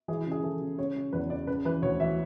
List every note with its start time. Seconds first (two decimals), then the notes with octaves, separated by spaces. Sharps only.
0.08 E3 G#4
0.20 E4
0.27 C#3 G#4
0.43 E3 A4
0.62 C#3
0.78 C#3 C#5
0.96 C#3
1.13 E2 B4
1.30 C#3 D5
1.47 C#3 B4
1.65 E3 B4
1.82 D2 C#5
2.00 E3 E5